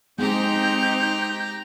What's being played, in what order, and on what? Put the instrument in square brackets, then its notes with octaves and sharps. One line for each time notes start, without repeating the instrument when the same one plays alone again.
[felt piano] G#3 [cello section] C4 D#4 [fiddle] G4 A#5 [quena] G6